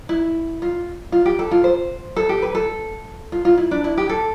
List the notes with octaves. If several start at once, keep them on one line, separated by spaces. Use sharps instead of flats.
E4
F4
F4
G4
A4
F4
C5
A4
G4
B4
A4
F4
F4
E4
D4
E4
G4
A4